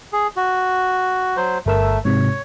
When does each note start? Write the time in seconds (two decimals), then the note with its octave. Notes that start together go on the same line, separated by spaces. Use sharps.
0.13 G#4
0.36 F#4
1.37 F#3 C5
1.66 G1 A3 A#4 E6
2.05 G#2 C3 C#5